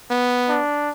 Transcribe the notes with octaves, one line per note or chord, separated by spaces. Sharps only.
B3
D4